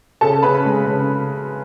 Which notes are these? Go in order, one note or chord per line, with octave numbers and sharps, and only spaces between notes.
C#3 A4 A5
C#3 B4 B5
G#3
C#3